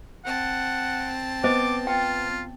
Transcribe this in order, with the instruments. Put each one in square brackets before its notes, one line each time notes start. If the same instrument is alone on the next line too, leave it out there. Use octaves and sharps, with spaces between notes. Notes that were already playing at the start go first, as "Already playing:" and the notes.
[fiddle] C4 A5 [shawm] F#5
[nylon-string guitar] B3 [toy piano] C5 D#5 [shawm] D6
[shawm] F4 [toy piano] G5